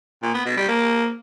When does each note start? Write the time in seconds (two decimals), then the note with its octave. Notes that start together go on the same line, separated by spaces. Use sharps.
0.23 A#2
0.34 B3
0.45 B2
0.57 G3
0.68 A#3